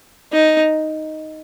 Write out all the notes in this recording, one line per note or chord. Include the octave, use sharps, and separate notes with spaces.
D#4